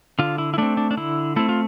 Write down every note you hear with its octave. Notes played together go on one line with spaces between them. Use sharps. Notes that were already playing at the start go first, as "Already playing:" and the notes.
D3 F4
E4
E4
A3 C4 D4
D4
D4
D3 E4
A3 C4 E4
F4